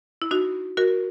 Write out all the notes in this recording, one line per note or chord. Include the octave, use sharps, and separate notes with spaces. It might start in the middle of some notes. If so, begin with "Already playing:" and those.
E4
D#4 F#4
F#4 A#4